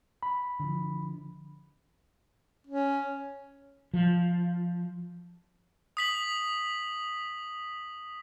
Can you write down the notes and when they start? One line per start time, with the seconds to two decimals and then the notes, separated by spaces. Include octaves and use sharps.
0.23 B5
0.60 D3 D#3 F3
2.67 C#4
3.94 F3
5.97 D#6 B6 F#7